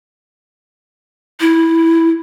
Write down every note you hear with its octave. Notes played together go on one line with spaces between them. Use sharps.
E4